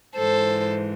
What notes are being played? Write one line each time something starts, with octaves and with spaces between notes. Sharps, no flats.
G#2 E3 A4 C5